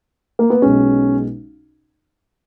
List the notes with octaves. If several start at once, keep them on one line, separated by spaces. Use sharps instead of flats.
A#3
B3
B1 B2 G#3 C#4